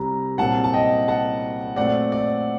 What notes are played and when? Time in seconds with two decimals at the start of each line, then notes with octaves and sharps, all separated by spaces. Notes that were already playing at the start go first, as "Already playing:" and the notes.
Already playing: C2 C3 G3 A#5
0.38 C2 A#2 F#3 C4 F#5 A5
0.64 A5
0.73 D#5 G5
1.08 F#5 A5
1.76 A#2 F#3 A3 C4 D5 F#5
2.12 D5